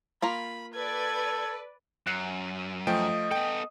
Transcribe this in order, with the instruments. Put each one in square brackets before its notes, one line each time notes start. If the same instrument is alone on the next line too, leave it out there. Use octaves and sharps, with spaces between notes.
[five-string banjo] A#3 F4 A#5 [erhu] B5
[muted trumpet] A4 [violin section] B4 D5 [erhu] G#6
[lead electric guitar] F#2 [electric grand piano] F#6 C7 C#7
[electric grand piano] F3 A3 G5 [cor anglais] D#5
[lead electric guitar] B3 A4 [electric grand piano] G5